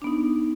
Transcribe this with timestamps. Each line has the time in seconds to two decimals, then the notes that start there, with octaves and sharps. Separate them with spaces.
0.02 D4
0.04 B3
0.07 D#4